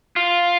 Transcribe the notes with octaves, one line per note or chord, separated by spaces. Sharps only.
F4